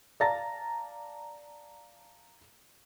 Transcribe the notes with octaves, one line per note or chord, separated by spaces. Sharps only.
D5 F5 A5 A#5 A6 A#6